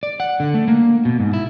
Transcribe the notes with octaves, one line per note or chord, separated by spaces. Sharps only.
D5
F#5
D3
A3
A#3
B2
G#2
E4